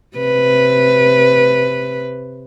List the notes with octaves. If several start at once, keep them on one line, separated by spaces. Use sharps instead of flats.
C3 B4